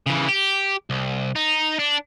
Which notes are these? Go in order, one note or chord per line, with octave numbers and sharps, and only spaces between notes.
C#3 E3
G4
C2
D#4
D4